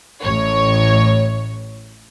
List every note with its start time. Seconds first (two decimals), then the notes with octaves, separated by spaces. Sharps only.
0.21 A1 A2 C#5